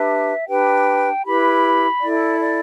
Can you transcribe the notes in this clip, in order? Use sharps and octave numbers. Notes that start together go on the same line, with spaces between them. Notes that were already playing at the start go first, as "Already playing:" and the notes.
Already playing: D4 G4 B4 E5
D4 G4 B4 G5
E4 G4 B4 B5
E4 A4 D5
D5